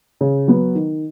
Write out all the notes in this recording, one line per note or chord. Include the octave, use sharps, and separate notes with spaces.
C#3
F#3 B3
D#3